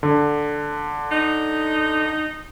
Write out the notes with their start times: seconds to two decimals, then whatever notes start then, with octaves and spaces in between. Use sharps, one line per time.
0.03 D3
1.11 D#4